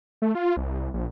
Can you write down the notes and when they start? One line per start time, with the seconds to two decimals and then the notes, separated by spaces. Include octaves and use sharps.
0.22 A3
0.35 F4
0.57 C2
0.94 A#1